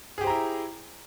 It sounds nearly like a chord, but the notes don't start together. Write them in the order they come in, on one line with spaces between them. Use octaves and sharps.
G#4 G4 C5 A#5 E4